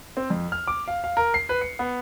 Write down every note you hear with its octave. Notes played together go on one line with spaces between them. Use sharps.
C4
F2
F6
D6
F5
F5
A#4
C7
B4
C#7
B3